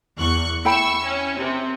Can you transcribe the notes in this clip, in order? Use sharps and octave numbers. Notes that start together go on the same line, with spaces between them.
E2 C#6 F#6
E4 G5 B5 C#6 E6
C#4
C3